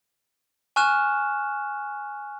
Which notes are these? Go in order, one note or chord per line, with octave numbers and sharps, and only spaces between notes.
G#5 C#6 F6 F#6 E7